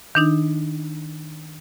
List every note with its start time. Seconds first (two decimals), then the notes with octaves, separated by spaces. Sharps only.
0.15 D#3 D4 D#4